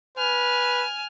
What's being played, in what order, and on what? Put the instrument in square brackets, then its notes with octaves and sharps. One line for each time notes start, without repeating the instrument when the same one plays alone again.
[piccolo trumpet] B4 [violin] G#5 F6